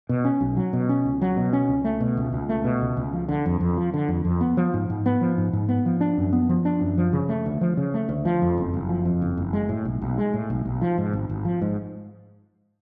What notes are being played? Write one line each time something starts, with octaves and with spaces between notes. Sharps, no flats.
B2
C#4
B1
F#3
B2
C#4
C#2
F#3
B2
C#4
C#2
A3
B2
C#2
C#2
A3
B2
C#2
C#2
F3
D3
F2
F2
F3
D3
F2
F2
B3
F3
G#2
G#2
B3
F3
G#2
G#2
B3
F3
D4
F#2
B3
F3
D4
F#2
F3
C#3
A3
D2
F3
C#3
A3
D2
F3
F2
F#1
F#1
F3
F2
F#1
F#1
G#3
A2
B1
B1
G#3
A2
B1
B1
F3
G#2
G#1
G#1
F3
G#2